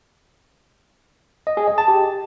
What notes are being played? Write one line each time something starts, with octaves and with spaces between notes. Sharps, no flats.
D#5
G#4
D#5
A5
G4